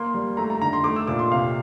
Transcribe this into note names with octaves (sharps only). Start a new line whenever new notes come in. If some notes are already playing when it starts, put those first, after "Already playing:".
Already playing: A#3 C6
G3
A3 A#5
A#5
D3 A#5
C6
A3 D6
E6
A#2 D6
C6
C3 F5